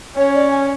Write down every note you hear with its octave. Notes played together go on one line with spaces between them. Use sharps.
C#4 C#5
D5
G#5